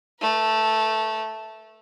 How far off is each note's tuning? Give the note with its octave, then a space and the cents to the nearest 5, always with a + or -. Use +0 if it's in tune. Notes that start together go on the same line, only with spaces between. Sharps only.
A3 +0 B4 -35